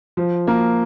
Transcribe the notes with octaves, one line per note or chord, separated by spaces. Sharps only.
F3
A#3